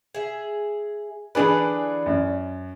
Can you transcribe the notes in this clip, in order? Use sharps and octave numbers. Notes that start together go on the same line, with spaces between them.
G#4 E5
D3 E3 D4 G#4 B4 D5
F#2